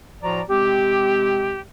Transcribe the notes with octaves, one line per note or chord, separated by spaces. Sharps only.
A2 F3 F#4 D5 A#5
C3 G#3 C4 G4